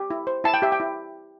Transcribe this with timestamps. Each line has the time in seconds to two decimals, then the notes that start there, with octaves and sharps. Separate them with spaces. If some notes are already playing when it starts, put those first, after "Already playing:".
Already playing: G4
0.10 E4
0.27 C5
0.44 E4 A5
0.54 G5
0.62 G4 E5
0.72 G5
0.80 E4